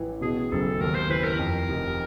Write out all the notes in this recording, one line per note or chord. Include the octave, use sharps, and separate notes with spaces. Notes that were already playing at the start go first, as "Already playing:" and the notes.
Already playing: A1 E3
B2 G#4
F#1 A4
D#2 A#4
C5
E3 B4
A#4
F2
F1